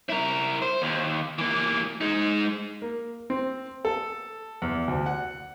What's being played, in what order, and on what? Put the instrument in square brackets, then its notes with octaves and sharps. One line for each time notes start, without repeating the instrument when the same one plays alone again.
[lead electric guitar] E4 A#4
C5
D#2
E3 A#3
G#3 D#4
[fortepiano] A#3
C4
A4
E2
D2
F#5